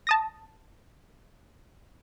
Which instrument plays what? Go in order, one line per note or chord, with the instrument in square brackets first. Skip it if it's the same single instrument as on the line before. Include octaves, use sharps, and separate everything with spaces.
[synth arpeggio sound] A5 D#6 A#6